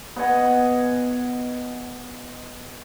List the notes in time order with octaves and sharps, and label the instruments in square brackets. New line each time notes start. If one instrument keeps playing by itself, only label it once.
[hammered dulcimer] B3 D#5 F#5 G#5